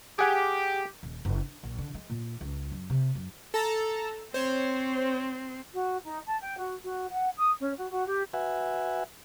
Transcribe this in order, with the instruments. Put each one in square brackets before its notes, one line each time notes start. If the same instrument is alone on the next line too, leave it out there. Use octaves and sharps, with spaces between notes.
[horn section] G4 [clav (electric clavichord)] G#4 F#5 G#5
[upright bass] D#1
F#1
D4
A#1
D3
G#3
A#2
C#2
F#2
C3
F#2
[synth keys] A4 A5 A#5
[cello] C4 [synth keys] C5 C#5
[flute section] F#4
D#4
A5
G5
F#4
F#4
F#5
D#6
C#4
F#4
F#4
G4
[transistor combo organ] F#4 B4 E5 F#5 G#5